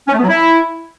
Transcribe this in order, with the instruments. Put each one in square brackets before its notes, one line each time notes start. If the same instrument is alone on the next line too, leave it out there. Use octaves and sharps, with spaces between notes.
[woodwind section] C#4
A3
B3
F#3
E4